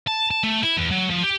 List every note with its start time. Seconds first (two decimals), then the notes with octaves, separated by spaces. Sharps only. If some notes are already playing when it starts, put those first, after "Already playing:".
0.07 A5
0.31 A5
0.43 A3
0.63 E4
0.77 E2
0.91 F#3
1.10 F3
1.23 G4